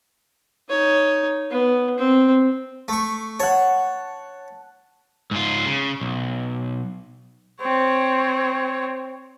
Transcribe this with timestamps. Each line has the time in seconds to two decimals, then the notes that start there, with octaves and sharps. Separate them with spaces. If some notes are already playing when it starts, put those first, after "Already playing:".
0.69 D#4 C#5
1.50 B3
1.98 C4
2.88 A3 C#6
3.40 C#5 F#5 A5
5.31 G#2 F4
5.66 C#3
6.01 B1
7.61 C4 C#5